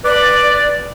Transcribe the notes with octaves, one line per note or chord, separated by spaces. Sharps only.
B4 D5